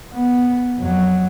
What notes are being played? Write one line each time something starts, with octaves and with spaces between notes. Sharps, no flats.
B3
F2 F#3